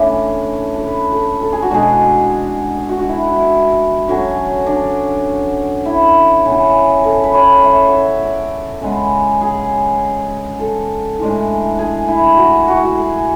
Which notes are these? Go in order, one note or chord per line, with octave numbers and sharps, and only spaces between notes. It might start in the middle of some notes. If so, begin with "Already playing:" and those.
Already playing: E3 A3 C#4 D4
A4
B4
A4
A4
G#4
F#4
B2 G#3 D4 G#4
F#4
F#4
E4
E4
D3 F#3 C#4
D4
E4
C#3 E3 B3
A4
B4
C#5
E5
E5 F#5
D5
C#3 G#3 B3
G#4
A4
A2 E3 G#3 D4
G#4
E4
F#4
F#4
E4
F#4
G#4